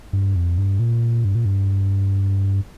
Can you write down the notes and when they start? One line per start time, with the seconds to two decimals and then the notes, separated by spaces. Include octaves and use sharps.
0.13 G2
0.36 F2
0.58 G2
0.79 A#2
1.25 G2
1.35 A#2
1.45 G2